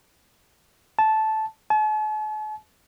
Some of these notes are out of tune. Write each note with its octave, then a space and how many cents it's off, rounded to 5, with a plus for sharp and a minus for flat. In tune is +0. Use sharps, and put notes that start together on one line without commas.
A5 -10
A5 -45